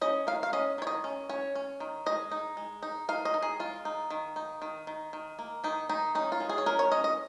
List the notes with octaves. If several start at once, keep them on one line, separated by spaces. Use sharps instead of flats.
C#4 D#5
D#3 F5
F5
C#4 D#5
D#3 C#5
D#5
C#4
C#4 C#5
C#4
D#3
G#3 D#5
D#4
G#3
D#4
D#4 F5
D#5
D#4
G#4
G#3 F4
D#4
D#3
D#4
D#3
D#3
D#3
A#3
D#3 D#4
D#3 D#4
C#4 D#4
F4
G#3
G#4
C#5
C#4 A#4
C#5
C#4 D#5
D#5